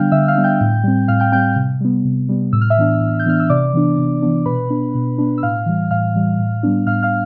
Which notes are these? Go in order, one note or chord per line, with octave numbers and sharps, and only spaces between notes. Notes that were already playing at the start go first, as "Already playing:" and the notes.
Already playing: D3 G3 B3 D4 F5 G5 F6 G6
D3 E5 E6
F5 F6
G3 B3 D4
G5 G6
A2
G3 C4
A2 F5 F6
G5 G6
G3 C4 G5 G6
C3
G3 B3
C3
G3 B3
A2 E6
F6
E5 E6
E3 B3 D4
A2
G6
E3 B3 D4 F6
E6
C3 D5 D6
E3 B3 D4
C3
E3 B3 D4
B2 B4 B5
B3 D4
B2
B3 D4
E6
A2 F5 F6
E3 G3
A2 F5 F6
E3 G3
A2
G3 B3 D4
A2 F5 F6
F5 F6